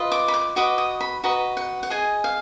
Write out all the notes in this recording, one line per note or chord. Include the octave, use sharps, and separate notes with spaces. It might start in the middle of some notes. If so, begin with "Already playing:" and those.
Already playing: F4 B4 D#5
D6
B5
D6
F#4 B4 D#5 D6
D#6
B5
F#4 B4 D#5 A#5
F#5
F#5
G#4 D#5 G#5
F5